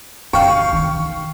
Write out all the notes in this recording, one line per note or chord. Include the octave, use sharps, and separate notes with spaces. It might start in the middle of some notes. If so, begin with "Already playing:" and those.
D3 F5 G5 C#6
D#3